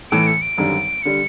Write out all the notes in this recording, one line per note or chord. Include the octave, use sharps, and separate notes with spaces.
A2 E3 A3 D7
C#7
D7
G#1 F#2 D3 G3
D3 G3 C#7